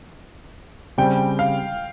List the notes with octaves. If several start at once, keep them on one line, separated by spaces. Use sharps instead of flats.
C#3 G3 C4 G5
F5